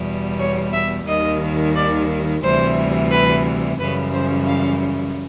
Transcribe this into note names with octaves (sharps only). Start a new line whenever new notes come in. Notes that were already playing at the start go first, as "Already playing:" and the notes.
Already playing: E2 B2 G3
C#5
E5
D#2 D#3 G3 D#5
D5
D2 C3 E3 G3 C5
B4
F#2 C#3 E3 G3 B4
C5
F5